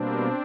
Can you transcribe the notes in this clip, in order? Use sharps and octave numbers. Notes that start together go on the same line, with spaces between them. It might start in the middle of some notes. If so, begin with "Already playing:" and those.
Already playing: B2 G3 A#3 C4 D4